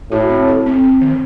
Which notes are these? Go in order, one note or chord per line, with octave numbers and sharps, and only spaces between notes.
A2 F#4
C4
A4
C4
C4
D#3